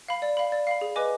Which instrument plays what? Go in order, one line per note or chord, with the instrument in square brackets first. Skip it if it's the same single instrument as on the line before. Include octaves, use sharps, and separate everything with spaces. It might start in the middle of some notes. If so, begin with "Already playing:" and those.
[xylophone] F5 B5
D5
F5 B5
D5
F5 B5
G#4
B4 D#5 G#5 D6